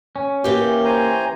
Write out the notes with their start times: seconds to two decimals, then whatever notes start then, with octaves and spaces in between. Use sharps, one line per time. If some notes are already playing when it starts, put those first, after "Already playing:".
0.16 C#4
0.44 E3 A#3 G4
0.85 C5 G#5 A#5